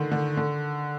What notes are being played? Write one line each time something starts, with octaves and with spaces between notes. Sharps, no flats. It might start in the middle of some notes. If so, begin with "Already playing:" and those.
Already playing: D3 D#3
D3
D3